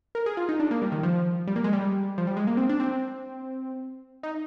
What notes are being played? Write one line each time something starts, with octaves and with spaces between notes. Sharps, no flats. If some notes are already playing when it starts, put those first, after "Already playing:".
A#4
G#4
F4
D#4
D4
A#3
G3
D#3
F3
G3
A#3
G#3
G3
F3
G3
G#3
A#3
C4
D4
C4
D#4